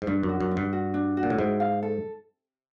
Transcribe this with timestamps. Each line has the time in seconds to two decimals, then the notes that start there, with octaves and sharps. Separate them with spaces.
0.02 G#2
0.07 G2 D4
0.23 F#2
0.29 F#4
0.41 F#2
0.51 D4
0.57 G2
0.73 F#4
0.94 D4
1.17 F#4
1.23 A#2
1.30 A2
1.38 G#2 E4
1.60 F5
1.83 A4